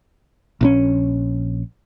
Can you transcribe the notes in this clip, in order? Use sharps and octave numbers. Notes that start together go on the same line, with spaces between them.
A#1 C#3 C#4